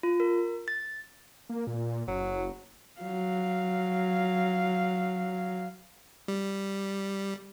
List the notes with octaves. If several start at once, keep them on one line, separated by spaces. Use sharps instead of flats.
F4
A#4
A6
A#3
A#2
F#1 F#3
F#3 F5
G3